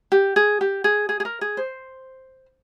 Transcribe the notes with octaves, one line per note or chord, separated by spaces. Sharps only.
G4
G#4
G4
G#4
G#4
G#4
A#4
G#4
C5